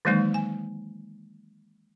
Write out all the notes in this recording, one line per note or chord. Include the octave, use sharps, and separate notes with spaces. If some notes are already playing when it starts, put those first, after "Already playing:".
D#3 E3 F#3 G#3 A#3 D#4
G#5